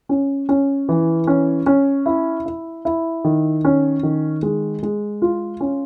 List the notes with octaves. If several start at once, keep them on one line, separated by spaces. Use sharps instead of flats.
C#4
C#4
E3
C#4
C#4
E4
E4
E4
D#3
C#4
D#3
G#3
G#3
F4
C#4